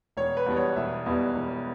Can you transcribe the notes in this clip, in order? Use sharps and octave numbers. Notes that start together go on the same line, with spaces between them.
E1 C#5
B4
E2 B2 G3 B3
C#5
E1 E5
E2 B2 G3 B3
E1